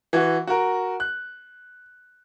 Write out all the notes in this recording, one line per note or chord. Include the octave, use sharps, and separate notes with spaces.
E3 F#4
F#4 A#4
F#6